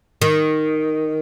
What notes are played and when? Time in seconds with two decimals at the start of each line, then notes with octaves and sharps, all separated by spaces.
0.22 D#3